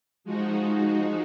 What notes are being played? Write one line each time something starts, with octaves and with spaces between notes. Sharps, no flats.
F3 G#3 D#4 F#4